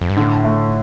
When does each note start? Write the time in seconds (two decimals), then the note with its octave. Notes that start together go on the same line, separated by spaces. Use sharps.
0.01 F2
0.10 G2
0.17 A2 D3
0.45 A3